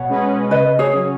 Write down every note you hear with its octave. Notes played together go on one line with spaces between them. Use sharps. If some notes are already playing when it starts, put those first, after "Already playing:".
Already playing: B2 C#5 F#5
G#3 C#4 B4 D#5
C#3 B4 D#5
G#4 C#5
F#3 C#4